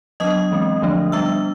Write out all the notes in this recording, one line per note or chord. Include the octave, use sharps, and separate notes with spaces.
F#3 B3 D4 D#5 D#6
E3 G#3 C4
D3 F3 A3 D4
G3 B3 D4 E5 E6